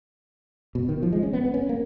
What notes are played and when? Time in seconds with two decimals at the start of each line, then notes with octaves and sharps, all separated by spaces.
0.75 B2
0.89 D#3
1.03 F3
1.13 G#3
1.23 C#4
1.33 B3
1.45 B3
1.54 C#4
1.69 A#3